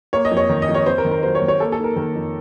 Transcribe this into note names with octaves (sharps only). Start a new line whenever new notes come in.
A#3 C#5
D#5
F2
C#5
D#3
D#5
F2
C#5
C4 C5
A#4
D#3
A#4
F#3 C5
C#5
D#3
C#5
A#3 A4
A4
D#4
A#4
D#3 A#4
F2